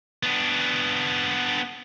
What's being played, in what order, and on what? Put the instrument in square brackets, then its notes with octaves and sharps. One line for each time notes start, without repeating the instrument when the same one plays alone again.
[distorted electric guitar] B3 D4